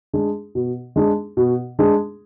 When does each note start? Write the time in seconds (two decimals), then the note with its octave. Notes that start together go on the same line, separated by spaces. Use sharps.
0.13 G#3 D4 G#4
0.55 B2
0.96 G#3 D4 G#4
1.37 B2
1.79 G#3 D4 G#4